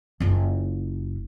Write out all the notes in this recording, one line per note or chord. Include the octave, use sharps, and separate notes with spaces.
F#1 F4